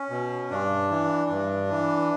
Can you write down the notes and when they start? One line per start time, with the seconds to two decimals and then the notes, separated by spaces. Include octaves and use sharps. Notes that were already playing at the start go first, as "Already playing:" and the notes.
Already playing: C#4
0.10 B2
0.50 G2 D4
0.91 E3
1.30 G2
1.70 E3